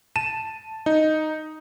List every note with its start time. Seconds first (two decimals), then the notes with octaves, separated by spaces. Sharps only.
0.16 A5 D#7 E7
0.86 D#4